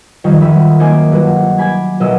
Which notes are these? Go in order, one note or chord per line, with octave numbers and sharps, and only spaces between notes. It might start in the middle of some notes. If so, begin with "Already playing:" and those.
F2 D#3 G3
F#2 D#3 E5 B5
A#3 D#4 C5 G#5 D6
G1 G2 F#3 F#4
G#5 B5 D6 G#6 A6
B1 A#2 F#3 D#5 E5 E6